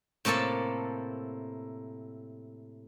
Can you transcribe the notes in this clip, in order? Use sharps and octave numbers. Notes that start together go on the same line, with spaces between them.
A2 C3 A#3 A4 A5